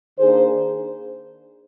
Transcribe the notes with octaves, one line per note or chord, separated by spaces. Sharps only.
D#3 A#3 D4 G#4 C5